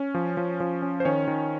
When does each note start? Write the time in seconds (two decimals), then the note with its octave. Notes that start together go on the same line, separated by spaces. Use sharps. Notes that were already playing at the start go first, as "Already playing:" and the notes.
Already playing: C#4
0.15 F3
0.37 F3
0.60 F3
0.82 C#4
1.00 C5
1.05 D#3 C#4 C#5
1.28 D#3